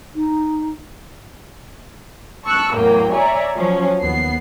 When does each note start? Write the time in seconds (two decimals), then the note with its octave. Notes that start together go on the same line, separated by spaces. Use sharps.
0.15 D#4
2.44 A5 C#6 E6 F#6
2.74 E2 A2 F#3 A#3 G5
3.13 C#5 D5 E5 G#5 A#5
3.57 F3 F#3 C#4
4.02 D#2 B3 C7